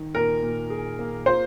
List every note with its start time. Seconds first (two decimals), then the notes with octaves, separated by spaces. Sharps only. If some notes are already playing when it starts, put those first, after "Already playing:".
Already playing: D#3
0.14 A#2 A#4
0.43 A#2
0.70 G#4
0.99 A#3
1.26 F4 C5